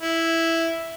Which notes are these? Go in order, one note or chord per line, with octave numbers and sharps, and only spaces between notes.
E4